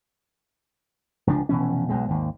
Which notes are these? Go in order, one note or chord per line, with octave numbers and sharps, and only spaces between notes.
F1 C#2 F3 D4
F1 B2 E3 C#4
B1 B2 G#3
G#1 D#2